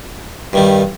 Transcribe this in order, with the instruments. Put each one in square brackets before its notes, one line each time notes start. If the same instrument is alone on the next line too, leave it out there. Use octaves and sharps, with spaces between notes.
[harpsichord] G2 D#3 G3